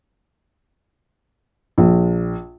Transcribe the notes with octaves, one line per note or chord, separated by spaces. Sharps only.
A#1